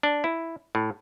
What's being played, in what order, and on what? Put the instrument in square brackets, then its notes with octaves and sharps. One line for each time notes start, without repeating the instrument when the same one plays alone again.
[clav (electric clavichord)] D4
E4
A2